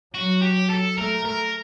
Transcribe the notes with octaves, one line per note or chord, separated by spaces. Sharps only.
F#3 F#4
G4
A4
A3 A#4
A#4